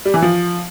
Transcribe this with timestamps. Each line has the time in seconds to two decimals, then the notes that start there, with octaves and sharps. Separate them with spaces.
0.05 G3
0.14 E3
0.22 F3